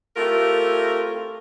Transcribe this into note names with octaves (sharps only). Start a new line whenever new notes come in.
A3 C4 E4 F4 G4 A#4